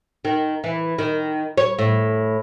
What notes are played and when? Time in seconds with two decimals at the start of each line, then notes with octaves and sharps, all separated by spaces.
0.25 D#3
0.64 E3
0.98 D#3
1.58 C#5
1.79 A2